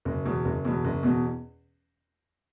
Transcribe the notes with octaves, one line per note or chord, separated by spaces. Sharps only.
F#1
E2 B2
F#1
E2 B2
F#1
E2 B2